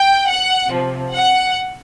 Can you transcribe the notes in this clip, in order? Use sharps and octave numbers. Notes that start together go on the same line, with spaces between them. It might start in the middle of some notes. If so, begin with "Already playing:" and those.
Already playing: G5
F#5
C3 F3
F#5